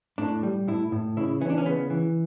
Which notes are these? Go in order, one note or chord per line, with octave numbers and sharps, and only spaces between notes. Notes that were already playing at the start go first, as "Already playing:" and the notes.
A2 D4
G3
A2 E4
A2
C#3 E4
E3 C#4
D4
C#4
C#3 B3
E3